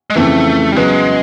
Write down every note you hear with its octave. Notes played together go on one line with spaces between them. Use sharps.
G#3
F2 C#3 E3 A3
G3
C#3 F#3 G#3 B3